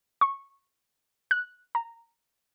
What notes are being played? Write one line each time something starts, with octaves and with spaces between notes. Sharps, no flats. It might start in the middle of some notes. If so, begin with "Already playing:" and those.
C#6
F#6
A#5